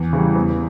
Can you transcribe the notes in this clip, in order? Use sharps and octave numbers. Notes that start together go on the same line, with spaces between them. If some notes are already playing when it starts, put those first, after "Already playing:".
Already playing: E2
C#3 E3 G3
E2